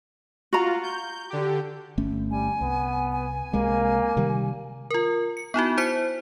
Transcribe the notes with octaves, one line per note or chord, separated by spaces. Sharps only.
F4 F#4 A#5
G6
D3 G4
G1 A3 C#4
G3 G#5
C2 B3
G#5
C2 C3 G#3 A#3
C3 D#3 G3
F4 A#4
C#7
B3 D#4 E4 F#4
E4 C5 B6 C#7